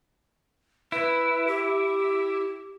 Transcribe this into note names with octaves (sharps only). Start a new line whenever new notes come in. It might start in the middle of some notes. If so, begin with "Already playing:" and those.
E4 B4
G4